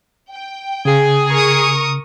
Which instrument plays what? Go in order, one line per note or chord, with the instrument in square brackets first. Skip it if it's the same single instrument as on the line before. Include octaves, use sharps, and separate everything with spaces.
[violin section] G5
[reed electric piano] C#3 [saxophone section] G#4
[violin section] A#4 C#6 D#6